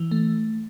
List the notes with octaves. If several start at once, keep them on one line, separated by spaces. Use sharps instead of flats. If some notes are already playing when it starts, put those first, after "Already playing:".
Already playing: E3
A3